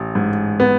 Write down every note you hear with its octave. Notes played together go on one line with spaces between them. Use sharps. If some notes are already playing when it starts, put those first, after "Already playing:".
Already playing: A1
G#2
B3